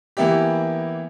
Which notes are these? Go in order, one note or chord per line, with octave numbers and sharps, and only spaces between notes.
E3 A#3 B3 E4 G4